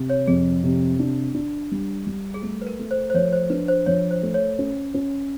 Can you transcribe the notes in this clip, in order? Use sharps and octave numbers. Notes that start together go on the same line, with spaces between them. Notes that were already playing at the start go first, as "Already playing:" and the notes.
Already playing: C3
C#5
F2 G#4
C3
D4
D4
G3
G3
G#4
A3 A4
B4
A#4
A3
C5
C5
F3 C#5
C5
D4 B4
C5
F3 C#5
C5
A3
C#5
C#4
C#4